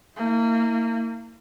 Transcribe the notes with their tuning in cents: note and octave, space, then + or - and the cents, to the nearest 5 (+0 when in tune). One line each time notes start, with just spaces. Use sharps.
A#3 -30 E4 -20